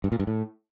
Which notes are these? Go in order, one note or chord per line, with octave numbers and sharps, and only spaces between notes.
G2
A#2
G2
A2